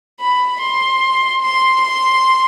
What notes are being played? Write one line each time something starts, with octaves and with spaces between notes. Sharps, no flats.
B5
C6
C6
C6